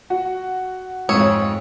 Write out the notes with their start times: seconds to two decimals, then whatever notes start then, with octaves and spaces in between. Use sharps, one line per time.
0.10 F#4
1.09 F2 G#2 G#3 C#5 D#6 E6